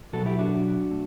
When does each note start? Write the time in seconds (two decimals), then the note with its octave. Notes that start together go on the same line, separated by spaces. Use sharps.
0.13 B2 F#3 B3 F#4 A4
0.26 E4 G4
0.39 D4 F#4
0.91 A3